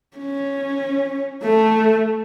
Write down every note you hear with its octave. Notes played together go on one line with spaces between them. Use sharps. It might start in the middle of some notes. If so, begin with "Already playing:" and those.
C#4
A3